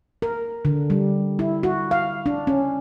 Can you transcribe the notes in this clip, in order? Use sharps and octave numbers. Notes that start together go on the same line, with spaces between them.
A#4
D3
G3
E4
F#4
F5
D4
C#4